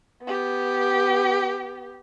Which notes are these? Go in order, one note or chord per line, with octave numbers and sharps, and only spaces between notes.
B3 G4